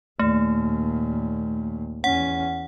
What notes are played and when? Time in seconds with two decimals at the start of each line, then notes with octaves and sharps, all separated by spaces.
0.19 D#2 A#2 A3
2.04 E2 C#4 F#5